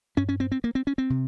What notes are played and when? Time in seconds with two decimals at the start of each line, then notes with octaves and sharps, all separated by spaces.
0.17 G2 C#4
0.29 C#4
0.40 C4
0.52 C4
0.64 A#3
0.75 C4
0.87 C#4
0.98 C4
1.10 C3